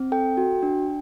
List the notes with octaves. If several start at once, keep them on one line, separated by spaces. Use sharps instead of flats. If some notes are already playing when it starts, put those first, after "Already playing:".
Already playing: C4
A4 G5
F#4
D4